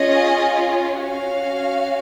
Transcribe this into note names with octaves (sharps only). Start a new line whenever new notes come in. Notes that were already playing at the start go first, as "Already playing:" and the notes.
Already playing: C#4 F4 G#4 D#5
C#4 F#4 F5